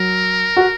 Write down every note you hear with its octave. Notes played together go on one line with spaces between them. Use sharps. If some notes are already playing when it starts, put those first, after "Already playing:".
Already playing: F#3 A#4
F#4